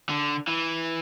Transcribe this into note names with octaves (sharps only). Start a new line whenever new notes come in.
D3
E3